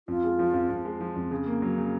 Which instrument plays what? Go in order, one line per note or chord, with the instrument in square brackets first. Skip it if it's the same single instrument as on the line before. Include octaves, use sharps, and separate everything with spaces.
[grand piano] F2 [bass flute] F4
[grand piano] G#3
F3
F2
F2
G#3
F3
F2
C#3
A#3
F#3
C#3